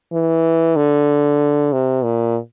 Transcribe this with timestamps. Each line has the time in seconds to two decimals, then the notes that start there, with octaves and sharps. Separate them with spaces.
0.13 E3
0.76 D3
1.73 C3
2.04 A#2